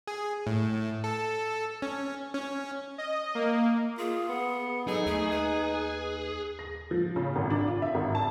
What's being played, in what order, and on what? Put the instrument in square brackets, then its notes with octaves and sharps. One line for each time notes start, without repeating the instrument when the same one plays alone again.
[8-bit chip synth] G#4
A2
A4
C#4
C#4
[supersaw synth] D#5
A#3
[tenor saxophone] F4 [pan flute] G#4
[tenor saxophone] B3
[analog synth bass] F#3 [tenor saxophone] D#4 [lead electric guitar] G#4 [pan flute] A4
[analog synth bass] D#2 [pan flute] A3
[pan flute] B4
[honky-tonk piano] A#6
F3
C#3
G#1
D4
F4
E5
G#1
A5